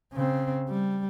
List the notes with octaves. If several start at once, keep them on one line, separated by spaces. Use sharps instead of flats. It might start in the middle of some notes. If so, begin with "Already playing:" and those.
C#3 C4
G3